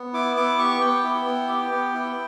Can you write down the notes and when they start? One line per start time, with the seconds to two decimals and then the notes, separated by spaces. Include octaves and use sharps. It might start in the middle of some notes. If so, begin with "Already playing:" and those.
Already playing: B3
0.13 E4 D6
0.36 B3 D6
0.58 G4 C#6
0.81 B3 G5
1.04 E4
1.26 B3
1.48 G4
1.71 B3
1.94 E4